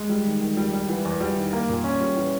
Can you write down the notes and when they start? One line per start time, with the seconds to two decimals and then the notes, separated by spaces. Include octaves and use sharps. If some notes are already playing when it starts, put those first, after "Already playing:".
Already playing: G#3
0.09 G3
0.26 D#3
0.42 D#3
0.57 G3
0.73 G3
0.89 E3
1.05 E2
1.21 G3
1.37 D#3
1.53 A#3
1.69 A#2
1.84 C#4
2.01 G3
2.17 E3